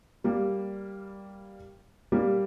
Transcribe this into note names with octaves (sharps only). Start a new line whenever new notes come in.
G3 A#3
G3 A#3